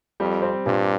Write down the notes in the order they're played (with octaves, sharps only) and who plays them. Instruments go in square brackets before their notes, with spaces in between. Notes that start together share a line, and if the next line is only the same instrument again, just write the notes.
[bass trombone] F2 [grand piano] G3
[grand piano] C4
[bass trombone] G2 [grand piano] A#2